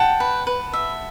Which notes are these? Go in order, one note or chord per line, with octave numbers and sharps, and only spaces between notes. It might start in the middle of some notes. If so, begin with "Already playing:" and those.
Already playing: F#5 G5 A5
B4
B4
E5